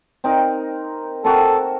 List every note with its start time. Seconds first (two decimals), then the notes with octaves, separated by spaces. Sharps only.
0.24 C4 D#4 A#4
1.24 C4 F#4 A4 A#4